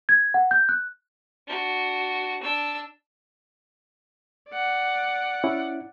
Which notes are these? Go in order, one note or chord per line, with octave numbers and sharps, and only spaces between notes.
G#6
F#5
G6
F#6
D4 F#4
D4 E6
D5 F#5
C#4 E4